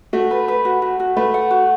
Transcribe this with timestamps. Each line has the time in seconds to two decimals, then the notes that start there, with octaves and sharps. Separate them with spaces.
0.13 A3 F#4
0.31 B4
0.48 B4
0.65 F#4
0.82 F#4
1.00 F#4
1.17 A3 B4
1.34 F#5
1.51 F#4